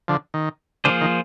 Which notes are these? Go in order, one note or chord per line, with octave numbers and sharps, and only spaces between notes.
D3 F3
D#3
D3 F3 A#3 F4 G#4 C5
D#3